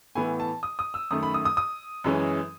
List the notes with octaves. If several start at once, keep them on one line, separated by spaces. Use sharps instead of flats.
A2 E3 B3 G#5
A5
D#6
D#6
E6
F#2 D#3 A3 D#6
B5
D#6
D#6
D#6
F#2 E3 G#3 C#4